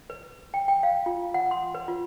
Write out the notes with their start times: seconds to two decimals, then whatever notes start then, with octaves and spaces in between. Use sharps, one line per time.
0.10 B4
0.54 G5
0.68 G5
0.83 F5
1.06 F4
1.34 F#5
1.51 C6
1.75 B4
1.88 F4